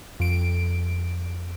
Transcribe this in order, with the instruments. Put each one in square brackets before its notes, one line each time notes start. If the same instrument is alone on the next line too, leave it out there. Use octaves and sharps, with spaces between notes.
[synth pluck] F2 D7